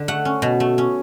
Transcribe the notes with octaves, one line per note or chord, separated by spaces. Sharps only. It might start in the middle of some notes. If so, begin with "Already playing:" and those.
Already playing: D3
A3 F#5
C#4
B2
A3
C#4